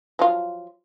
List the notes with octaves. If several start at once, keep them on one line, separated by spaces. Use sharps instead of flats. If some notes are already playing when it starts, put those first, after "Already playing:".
F3 F#3 F4